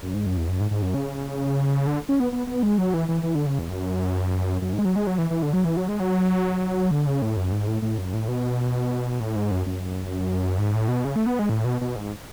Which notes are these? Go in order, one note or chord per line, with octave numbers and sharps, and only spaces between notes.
F#2
G#2
F#2
E2
F#2
G#2
G#2
F#2
C#3
D3
C#4
B3
B3
B3
G#3
F#3
E3
E3
E3
D3
C#3
E2
F#2
F#2
G#2
G#3
F#3
G#3
F#3
E3
E3
D3
F#3
E3
F#3
G#3
F#3
D3
C#3
A2
F#2
G#2
A2
A2
F#2
A2
B2
A2
G#2
F#2
F#2
G#2
A2
B2
C#3
A3
B3
G#3
A2
B2
B2
G#2